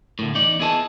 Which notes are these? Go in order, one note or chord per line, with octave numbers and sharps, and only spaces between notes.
D2 A2
E2 D#4 D5
B3 E4 G#4 D#5 G#5 A5